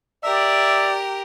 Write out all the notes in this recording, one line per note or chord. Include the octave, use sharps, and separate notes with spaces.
G4 A#4 D5 E5